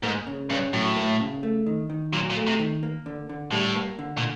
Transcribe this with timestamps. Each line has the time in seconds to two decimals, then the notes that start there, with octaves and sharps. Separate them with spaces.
0.03 G#2 A#3
0.27 C#3
0.50 G2 C#4
0.73 A2 F#3
0.96 A#3
1.20 C#3
1.43 A3
1.66 D#3
1.90 D#3
2.13 A#2 F#3
2.30 A#2
2.36 A3
2.47 C3
2.60 D#3
2.83 A#3
3.06 D3
3.29 D3
3.52 A2 G3
3.76 A#3
3.99 D3
4.18 A#2